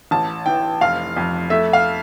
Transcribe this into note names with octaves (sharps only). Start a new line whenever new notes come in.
A1 A5
E3 G5
F1 F5
F2
A3 E5
F5